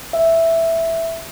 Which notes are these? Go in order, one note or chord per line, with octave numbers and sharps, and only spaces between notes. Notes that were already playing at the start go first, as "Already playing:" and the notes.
E5